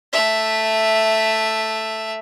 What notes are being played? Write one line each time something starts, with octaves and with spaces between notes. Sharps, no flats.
A3 E5